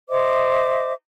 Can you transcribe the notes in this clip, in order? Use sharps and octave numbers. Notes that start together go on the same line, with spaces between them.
C5 D#5 E5 D6